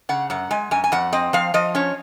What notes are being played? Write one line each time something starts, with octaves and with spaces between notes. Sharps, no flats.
C#3 F#5
F#2 F#5
G#3 G#5
F#2 G#5
G#5
F2 F#5
C4 D#5
F3 F5
F3 D#5
C#4 C#5